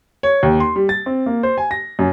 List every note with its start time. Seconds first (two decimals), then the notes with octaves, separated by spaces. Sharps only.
0.23 C#5
0.43 D#2
0.60 C6
0.76 G3
0.89 A6
1.06 C4
1.26 A#3
1.43 C5
1.58 G#5
1.71 A#6
1.99 F#2